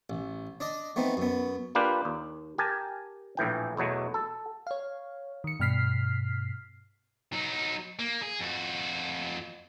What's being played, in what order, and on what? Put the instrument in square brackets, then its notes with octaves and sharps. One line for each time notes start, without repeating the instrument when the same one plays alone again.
[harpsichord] A1
D4 D5 D#5
A3 B3 C4 D#4
F#2 B3
[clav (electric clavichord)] A#3 D4 F4 G4 B4
D#2
G4 A#4 G#5 A5
A#1 A2 E3 G5
E2 B2 F#3 A3
A4
[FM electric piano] C#5 F5
D#3 C#7
G2 B2 F6 B6 C7
[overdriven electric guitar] F#3 D#4
A#3
G#4
F2 F#4